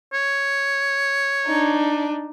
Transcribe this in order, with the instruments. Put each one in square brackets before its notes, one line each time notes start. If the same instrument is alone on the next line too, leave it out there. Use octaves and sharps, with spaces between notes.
[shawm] C#5
[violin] D4 D#4